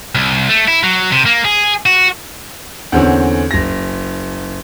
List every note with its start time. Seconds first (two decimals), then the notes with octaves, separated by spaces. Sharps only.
0.15 C2
0.49 A3
0.68 E4
0.83 F#3
1.12 C3
1.26 A#3
1.45 G#4
1.86 F#4
2.92 E2 D3 C4 C#4
3.51 F#1 A#6